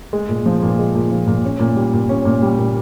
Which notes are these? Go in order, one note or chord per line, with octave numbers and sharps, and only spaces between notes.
G#3
A#2
F3
A#2
G#3
A#2
F3
A#2
C#4
A#2
G3
A#2
C#4
A#2
G3
A#2